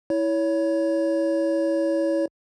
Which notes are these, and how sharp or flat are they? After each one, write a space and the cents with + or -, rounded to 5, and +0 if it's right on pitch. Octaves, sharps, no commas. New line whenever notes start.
E4 -10 C#5 +20